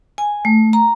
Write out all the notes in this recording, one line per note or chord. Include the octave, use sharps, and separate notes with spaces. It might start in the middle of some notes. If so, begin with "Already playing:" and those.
G#5
A3
A#5